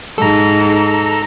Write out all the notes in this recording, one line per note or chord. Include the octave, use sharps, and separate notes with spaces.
G#2 A4 A#5